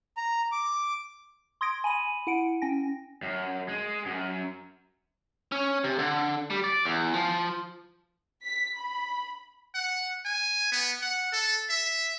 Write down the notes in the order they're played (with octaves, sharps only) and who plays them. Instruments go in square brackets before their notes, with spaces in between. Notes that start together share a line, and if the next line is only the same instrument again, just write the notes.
[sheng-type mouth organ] A#5
D6
[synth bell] C6 D#6 G#6 A#6 D7
G#5 B5 D#7
E4 F#5 D7
C#4 G5 G#5 A#6
[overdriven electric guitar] F#2
G#3
F#2
[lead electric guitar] C#4
C3
D3
G3
D5
E2
F3
[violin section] B6
B5
[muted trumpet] F#5
G#5
B3
F#5
A4
E5